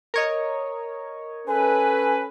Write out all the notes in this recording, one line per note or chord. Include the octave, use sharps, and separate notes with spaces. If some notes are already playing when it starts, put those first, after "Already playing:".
A#4 C#5 D#5
C#4 A4 B4 G#5